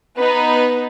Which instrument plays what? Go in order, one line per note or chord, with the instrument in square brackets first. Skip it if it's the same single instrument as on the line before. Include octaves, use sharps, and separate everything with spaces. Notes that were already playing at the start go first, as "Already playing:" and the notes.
[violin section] B3 D#4 B4